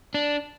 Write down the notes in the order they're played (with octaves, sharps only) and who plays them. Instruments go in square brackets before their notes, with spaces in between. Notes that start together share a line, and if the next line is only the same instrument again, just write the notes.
[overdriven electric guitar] D4